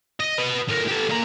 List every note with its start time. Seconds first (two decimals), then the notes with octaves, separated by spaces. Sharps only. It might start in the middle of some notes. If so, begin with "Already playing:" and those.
0.20 D#5
0.38 B4 D#5
0.69 A2 A#4
0.88 G4 A4
1.09 A#2 A#5